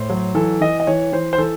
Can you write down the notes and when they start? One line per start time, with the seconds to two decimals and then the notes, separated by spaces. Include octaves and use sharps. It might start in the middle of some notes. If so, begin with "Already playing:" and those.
Already playing: A2 C5
0.10 F#3
0.35 E3 A4
0.61 E3 D#5
0.80 D#5
0.87 E3 C#5
1.12 E3 C5
1.33 C5
1.38 E3 A4